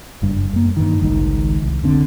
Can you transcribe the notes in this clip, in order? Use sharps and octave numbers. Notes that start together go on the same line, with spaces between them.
F#1 G2
F#2 A#3
G2 D#3
G#1 C#2 G#2 D#3
C2
F1 D3 C4